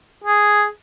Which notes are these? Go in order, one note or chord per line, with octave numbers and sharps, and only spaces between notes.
G#4